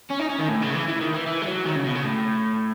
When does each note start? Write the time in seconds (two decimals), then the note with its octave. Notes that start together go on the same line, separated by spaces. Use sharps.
0.10 C#4
0.19 D#4
0.29 C#4
0.39 D#3
0.49 A2
0.62 C#3
0.75 E3
0.88 E3
1.01 D#3
1.14 E3
1.27 E3
1.42 G#3
1.47 F#3
1.65 D#3
1.76 C#3
1.85 B2
1.95 C#3
2.04 A2